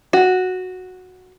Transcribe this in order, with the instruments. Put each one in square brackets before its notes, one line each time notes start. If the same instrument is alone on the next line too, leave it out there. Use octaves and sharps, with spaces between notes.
[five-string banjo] F#4